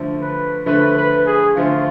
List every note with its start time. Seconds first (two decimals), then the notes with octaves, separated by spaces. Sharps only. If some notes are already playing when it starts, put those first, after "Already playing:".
Already playing: D3 F3 A3
0.21 B4
0.66 D3 F3 A3 B4
0.97 B4
1.26 G#4
1.56 D3 F3 A3 F4